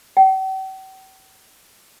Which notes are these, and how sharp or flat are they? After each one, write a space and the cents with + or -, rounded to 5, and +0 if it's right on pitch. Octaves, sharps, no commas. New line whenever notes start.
G5 -45